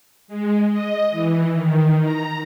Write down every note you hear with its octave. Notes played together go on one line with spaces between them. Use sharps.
G#3
D#5
E3
D#3
A#5